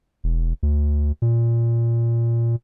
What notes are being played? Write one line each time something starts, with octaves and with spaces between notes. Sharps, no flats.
E1
D2
A#2